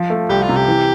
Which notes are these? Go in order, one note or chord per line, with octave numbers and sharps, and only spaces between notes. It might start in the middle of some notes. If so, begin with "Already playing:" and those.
Already playing: F3
A3
C2 G4
F4
C3
G4
E3